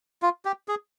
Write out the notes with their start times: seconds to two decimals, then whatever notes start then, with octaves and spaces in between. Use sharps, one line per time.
0.22 F4
0.45 G4
0.68 G#4